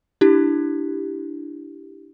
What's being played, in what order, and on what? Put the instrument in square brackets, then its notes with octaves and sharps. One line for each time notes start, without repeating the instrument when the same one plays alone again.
[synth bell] D4 E4 G4